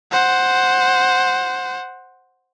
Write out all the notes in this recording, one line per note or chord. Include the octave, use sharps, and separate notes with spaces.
C5 F#5